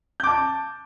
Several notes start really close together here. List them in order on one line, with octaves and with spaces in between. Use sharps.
G6 D6 A5